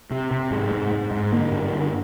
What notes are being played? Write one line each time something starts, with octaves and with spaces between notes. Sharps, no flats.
C3
C3
G#2 G#3
G#2
G#2
G#2
D3 A#3
G2
D3